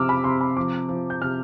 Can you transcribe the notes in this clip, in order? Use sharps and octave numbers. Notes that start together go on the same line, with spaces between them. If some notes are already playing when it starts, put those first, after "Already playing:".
Already playing: C3 F3 D6 E6 F6
B5
C3 C6
B5
F3 D6
F3
G6
C3 F6